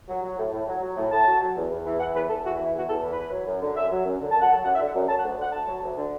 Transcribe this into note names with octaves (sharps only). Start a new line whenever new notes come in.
F#3
F#3
A2
A2
F#3
F#3
A2
A2 A5
F#3
F#3
E2
E2
E3
E3 F#5
E2 B4
E2 A4
E3 F#4
E4
E3
E4
E2 F#4
E2 A4
E3
B4
E3
F#3
F#2
D3
F#2 E5
F#3
F#2
D3
F#2 A5
F#5
F#3 A5
F#2 F#5
E5
D3
F#5
F#2
F#3 A5
F#5
D2
D3 F#5
D2 A5
F#3
D2
D3